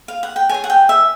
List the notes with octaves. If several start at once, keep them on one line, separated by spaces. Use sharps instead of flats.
F5
F#5
G5
G#4 C#5 G#5
F#5
G5
E5